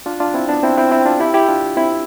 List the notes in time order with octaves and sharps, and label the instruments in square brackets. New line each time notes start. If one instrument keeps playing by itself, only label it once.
[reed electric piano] D4 F4
D4 F4
C4 E4
B3 D4
C4 E4
C4 E4
C4 E4
D4 F4
E4 G4
E4 G4
D4 F4
C4 E4